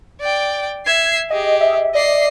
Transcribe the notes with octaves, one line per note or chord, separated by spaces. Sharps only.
D5 G5
E5 G#6 C7
G4 G#4 D#5
D#5 E5
D5 D#5 C7